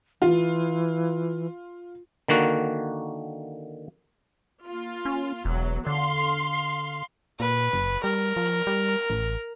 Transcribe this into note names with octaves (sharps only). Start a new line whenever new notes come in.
E3 F4
D3 D#3 A#3 F#4
A#3 F4
C#4
E1 E2 F#3
D3 F5 C6
A#2 B4
F#1
G3 A#4
F3
G3
A1